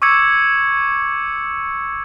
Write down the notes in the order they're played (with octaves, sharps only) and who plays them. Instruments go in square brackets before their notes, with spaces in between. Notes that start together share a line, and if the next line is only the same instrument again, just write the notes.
[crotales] C#6 D6 E6 G#6 C#7